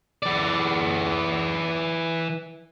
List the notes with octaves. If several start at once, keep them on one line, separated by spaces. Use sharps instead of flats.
E3 D5